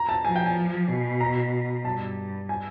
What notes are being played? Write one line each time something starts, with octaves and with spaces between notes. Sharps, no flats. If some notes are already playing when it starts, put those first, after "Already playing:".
Already playing: A#5
A5
F3 G#5
G5
G#5
B2
A#5
G2 A5
G#5